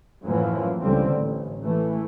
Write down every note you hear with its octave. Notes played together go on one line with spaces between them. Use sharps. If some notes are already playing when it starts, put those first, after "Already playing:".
F#2 A2 E3 F3 A#3
C#2 D3 G3 C4
A1
E3 A3